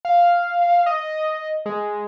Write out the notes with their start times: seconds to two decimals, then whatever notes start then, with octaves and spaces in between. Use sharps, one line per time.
0.05 F5
0.86 D#5
1.66 G#3